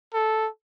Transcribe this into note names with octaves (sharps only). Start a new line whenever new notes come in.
A4